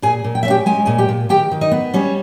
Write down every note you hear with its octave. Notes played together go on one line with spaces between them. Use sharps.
A#2 G#4 G#5
A#2
G5
C#4 E5
G4 G5
G#3 G#5
A#2 G#4 G#5
G4 G5
A#2
D#3 G4 G5
D#3
D#4 D#5
B3
G3 C#4 C#5